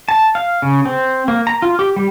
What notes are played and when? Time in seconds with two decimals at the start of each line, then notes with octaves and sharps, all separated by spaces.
0.09 A5
0.35 F5
0.62 C#3
0.85 C4
1.28 A#3
1.47 A#5
1.62 F4
1.79 G4
1.96 G3